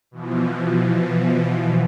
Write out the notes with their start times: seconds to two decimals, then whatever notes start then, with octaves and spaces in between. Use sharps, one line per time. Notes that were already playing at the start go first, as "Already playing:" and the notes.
0.11 B2 E3 F3